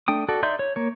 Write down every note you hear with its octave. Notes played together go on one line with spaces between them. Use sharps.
A3 D4 G5 D#6
F#4 A4 D5
D#4 D5 E5 C6 G6
C#5
A#3 C#5